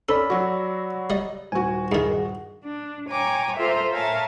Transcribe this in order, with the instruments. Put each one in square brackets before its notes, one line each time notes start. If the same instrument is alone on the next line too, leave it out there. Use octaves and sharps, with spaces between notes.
[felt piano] C#4 [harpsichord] A4 [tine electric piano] D5 B5 E6
[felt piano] F#3 F#4
[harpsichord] G3 D#5
[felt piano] D#1 F#4 [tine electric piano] G#5
[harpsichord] G2 D#3 [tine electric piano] G#4
[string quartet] D4
C#5 G5 G#5 A#5 D6
F4 A4 A#4 C5 E5 F5
A#4 C#5 E5 F5 G#5 A5